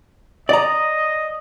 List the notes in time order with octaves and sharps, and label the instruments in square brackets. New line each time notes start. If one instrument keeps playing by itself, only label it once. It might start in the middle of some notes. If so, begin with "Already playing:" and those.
[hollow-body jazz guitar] D5 A#5 [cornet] D#5